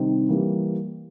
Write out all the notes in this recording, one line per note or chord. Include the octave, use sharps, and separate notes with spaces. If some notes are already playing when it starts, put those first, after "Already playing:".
Already playing: C3 D#3 G3 C4 D#4
E3 G3 A#3